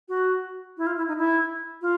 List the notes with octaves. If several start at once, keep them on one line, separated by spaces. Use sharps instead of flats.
F#4
E4
F4
E4
D#4
E4
F4